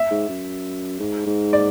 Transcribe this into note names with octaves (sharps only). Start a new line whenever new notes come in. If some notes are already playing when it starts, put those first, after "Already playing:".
Already playing: E5
G#2
F#2
G#2
G#2
D5